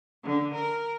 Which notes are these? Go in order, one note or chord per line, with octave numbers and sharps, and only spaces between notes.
D3
A#4